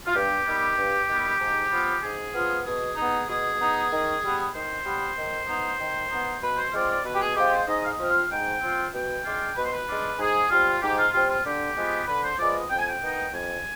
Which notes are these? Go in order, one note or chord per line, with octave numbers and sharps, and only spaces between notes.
F4
G2 G4
D#3 G3 B3
G2
D#3 G3 B3
G#2
F3 B3 F4
G#2 G#4
F3 B3 F4
B2 G#4
B3 D#4
B2 G#4
B3 D#4
D#3
G3 B3
D#3 C5
G3 B3
D#3
B3 D#4
D#3
B3 D#4
B2 B4
C5
G#3 C4 F4 D5
D5
B2 B4
G4
G#4
G#3 C4 F4 G4
C5
G#2 D#5
F5
D#5
F3 C4 F4
F5
G#2 G5
F3 C4 F4
B2 G5
G#3 D4 F4
B2 B4
C5
B4
G#3 D4 F4
G#2 G#4
G3 C4 F4
G#2 G4
F4
G3 C4 F4
F4
D3 G4
F3 G#3 B3
D3 B4
C5
F3 G#3 B3 D5
D#5
F2 G5
G#5
G5
D#3 B3 D#4
F2 G#5